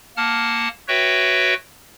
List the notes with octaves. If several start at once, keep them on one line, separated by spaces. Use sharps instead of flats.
A#3 F#5 A5 F6
F#4 B4 C#5 E5 G5